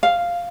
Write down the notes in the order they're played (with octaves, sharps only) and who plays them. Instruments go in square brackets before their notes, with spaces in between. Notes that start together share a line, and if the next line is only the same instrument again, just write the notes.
[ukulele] F5